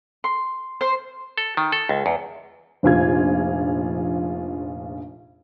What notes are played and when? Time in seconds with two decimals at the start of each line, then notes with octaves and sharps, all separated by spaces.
0.24 C6
0.81 C5
1.37 A4
1.57 D#3
1.72 A4
1.89 C#2
2.06 E2
2.83 F1 A#1 F4 G#6